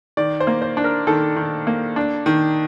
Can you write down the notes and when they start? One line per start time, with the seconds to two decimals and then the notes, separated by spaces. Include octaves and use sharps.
0.17 D#3 D5
0.40 C5
0.47 A#3
0.62 C5
0.77 D4
0.84 A#4
1.07 D#3 A4
1.36 D#3
1.67 A#3
1.96 D4
2.26 D#3